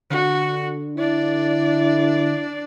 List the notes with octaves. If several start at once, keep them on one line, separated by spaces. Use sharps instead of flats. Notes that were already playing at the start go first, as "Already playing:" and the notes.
D3 F#4
D4 E4 D5